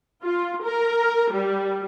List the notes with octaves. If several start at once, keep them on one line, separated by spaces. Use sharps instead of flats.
F4
A#4
G3